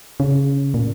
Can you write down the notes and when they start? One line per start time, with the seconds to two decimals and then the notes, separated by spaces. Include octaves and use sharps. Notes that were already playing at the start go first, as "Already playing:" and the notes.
0.20 C#3
0.74 A#2